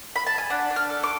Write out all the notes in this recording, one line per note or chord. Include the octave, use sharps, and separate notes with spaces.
B5
A5
G#5
D4 F#5
D4
F6
A4
D6